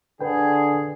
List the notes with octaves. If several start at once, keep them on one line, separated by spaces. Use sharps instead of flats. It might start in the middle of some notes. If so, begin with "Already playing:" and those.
D3 G#4 B4 G5